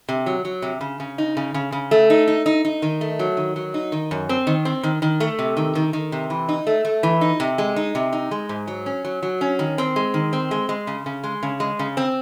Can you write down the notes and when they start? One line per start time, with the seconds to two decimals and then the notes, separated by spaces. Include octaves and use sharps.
0.09 C3
0.26 F#3
0.45 F#3
0.62 C3
0.81 C#3
1.00 C#3
1.18 D#4
1.37 C#3
1.54 C#3
1.72 C#3
1.91 A3
2.10 D#4
2.27 D#4
2.46 D#4
2.65 D#4
2.82 D#3
3.01 A3
3.19 F#3
3.37 D#3
3.56 F#3
3.74 D#4
3.92 D#3
4.11 F#2
4.29 C4
4.47 D#3
4.65 C4
4.83 D#3
5.02 D#3
5.20 A3
5.39 C3
5.57 D#3
5.75 D#3
5.93 D#3
6.12 C3
6.30 E3
6.49 D#4
6.67 A3
6.85 A3
7.03 E3
7.21 D#4
7.40 C3
7.58 G#3
7.76 D#4
7.95 C3
8.13 D#4
8.31 G#3
8.49 G#2
8.68 F#3
8.86 C#4
9.05 F#3
9.23 F#3
9.41 C#4
9.59 D#3
9.78 C4
9.96 G#3
10.14 D#3
10.33 C4
10.51 G#3
10.69 G#3
10.87 C#3
11.06 C#3
11.24 G#3
11.43 C#3
11.60 G#3
11.79 C#3
11.97 C4